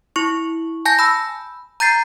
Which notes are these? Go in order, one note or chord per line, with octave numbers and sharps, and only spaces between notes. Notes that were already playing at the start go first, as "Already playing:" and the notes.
E4 C#6
G#5 A5 G6 A#6
B5 E6
A#5 G6 A6 C7